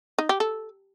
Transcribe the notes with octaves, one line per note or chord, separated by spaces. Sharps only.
D#4
G4
A4